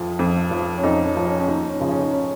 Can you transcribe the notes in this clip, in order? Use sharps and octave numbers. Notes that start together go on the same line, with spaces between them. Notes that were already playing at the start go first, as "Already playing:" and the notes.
Already playing: F2 F3
F2
F3
C#4
F2 D#4
C#4
F3
C#4
C#4
D#2 D#4
C#4
C#3 F3
C#4
D#4
C#4